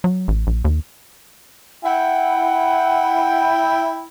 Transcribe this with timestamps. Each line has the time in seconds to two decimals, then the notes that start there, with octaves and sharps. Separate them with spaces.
0.04 F#3
0.28 A1
0.47 A#1
0.65 D#2
1.84 E4 F#5 G5